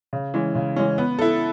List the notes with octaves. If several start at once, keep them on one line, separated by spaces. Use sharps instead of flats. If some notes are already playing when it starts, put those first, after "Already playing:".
C#3
E3 G#3 C#4
C#3
E3 G#3 C#4
B3
E4 A4